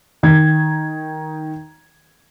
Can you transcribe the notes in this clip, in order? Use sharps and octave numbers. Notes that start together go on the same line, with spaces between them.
D#3 G#6